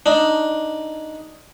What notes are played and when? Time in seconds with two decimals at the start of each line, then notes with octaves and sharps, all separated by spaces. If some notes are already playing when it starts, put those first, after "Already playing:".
0.06 D4 D#4